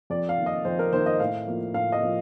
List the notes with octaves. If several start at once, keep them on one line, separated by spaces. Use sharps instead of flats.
F2 D5
F5
D#3 A#3
D#5
F2 C5
A#4
D#3 A#3 C5
D#5
A2 F5
F3 A#3
A2 F5
D#5
F3 A#3